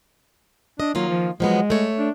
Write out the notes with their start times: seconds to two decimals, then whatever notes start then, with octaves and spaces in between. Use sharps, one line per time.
0.80 D4 D#5
0.95 D#3 F#3 A#3 F4
1.09 F3
1.40 F3 F#3 G#3 B3
1.70 A3 C#5
1.98 D4